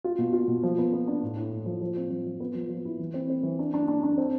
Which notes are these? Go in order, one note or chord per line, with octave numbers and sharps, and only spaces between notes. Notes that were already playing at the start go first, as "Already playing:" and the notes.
F4
B2
F4
B2
F3
B3
B3
D4
A2
A2
A2
F3
F3
C4
F3
F3
B3
F3
F3
E4
E3
C4
C4
E3
D4
D4
D4
D4
C4